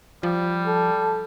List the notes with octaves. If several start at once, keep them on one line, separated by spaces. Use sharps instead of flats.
F3 G3
A4